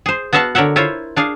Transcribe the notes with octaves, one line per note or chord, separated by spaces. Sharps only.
G#4 C5
B3 F#4 E5 F5 A5
D3 A#4 C#5 E5 F#5
E4 F4 C5 C#5
D4 G#4 F5